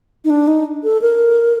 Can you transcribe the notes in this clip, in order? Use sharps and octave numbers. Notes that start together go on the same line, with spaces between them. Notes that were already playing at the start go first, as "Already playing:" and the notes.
D#4
D4
D#4
A4
A#4